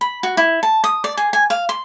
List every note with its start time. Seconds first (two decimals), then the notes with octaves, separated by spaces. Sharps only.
0.01 B5
0.23 F#4
0.37 E4
0.63 A5
0.84 D#6
1.04 D5
1.17 G#4
1.33 G#5
1.50 F5
1.69 C6